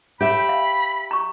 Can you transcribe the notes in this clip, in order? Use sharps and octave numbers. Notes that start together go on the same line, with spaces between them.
G4 C#5 E5 B5
F5
A#5 C#6